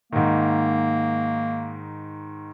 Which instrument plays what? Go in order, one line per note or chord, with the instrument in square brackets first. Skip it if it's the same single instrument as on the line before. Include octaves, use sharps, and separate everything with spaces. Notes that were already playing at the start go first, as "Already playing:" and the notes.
[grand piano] G#2 D#3 [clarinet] A#3